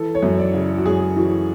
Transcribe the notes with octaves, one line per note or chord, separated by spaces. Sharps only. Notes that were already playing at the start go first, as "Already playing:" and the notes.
Already playing: E3 A4
C#5
F#2
D5
C#3
F#4
F#2 G#4
E3 F#4